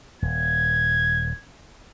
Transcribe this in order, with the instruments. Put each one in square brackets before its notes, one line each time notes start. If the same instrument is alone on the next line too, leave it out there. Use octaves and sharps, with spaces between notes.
[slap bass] D#1 [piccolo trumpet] G#6